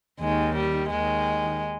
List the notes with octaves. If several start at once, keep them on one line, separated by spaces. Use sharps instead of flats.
D#2 D#3 G#3
G3
D#2 D#3 G#3